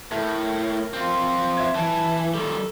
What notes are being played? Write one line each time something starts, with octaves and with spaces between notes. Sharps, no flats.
A2 A3 A#4
C4 F4
E5 G#6
E3 A5
D#3 G3 A4